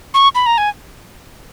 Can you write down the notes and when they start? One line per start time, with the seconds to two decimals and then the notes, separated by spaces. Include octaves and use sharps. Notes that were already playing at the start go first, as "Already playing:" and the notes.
0.14 C#6
0.35 B5
0.46 A#5
0.58 G#5